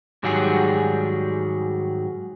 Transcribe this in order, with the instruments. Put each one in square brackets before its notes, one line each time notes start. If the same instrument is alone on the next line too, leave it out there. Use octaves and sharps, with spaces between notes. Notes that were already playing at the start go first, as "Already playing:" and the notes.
[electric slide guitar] G#2 D#3 F#3 G3 F#4 G#4